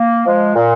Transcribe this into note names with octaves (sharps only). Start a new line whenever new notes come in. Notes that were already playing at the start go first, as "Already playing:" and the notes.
Already playing: A#3
F3 G#3
A#2